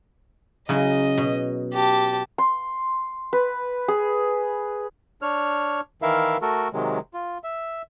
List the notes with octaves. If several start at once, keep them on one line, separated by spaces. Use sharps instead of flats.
C#3 F#3 E4 D#5
B2
G4 A5
C6
B4
G#4
D4 C#5 F6
D#3 E3 E4 A#4 E5 F5
A3 F#4 A4 A#4
C3 D#3 F#3 G#3
F4
E5